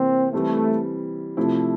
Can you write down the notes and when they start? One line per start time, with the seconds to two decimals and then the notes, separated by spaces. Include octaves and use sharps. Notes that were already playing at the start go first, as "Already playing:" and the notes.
Already playing: C3 E3 A#3 C4
0.32 E3 G3 A3 C4
1.37 C3 F3 A3 C4 E4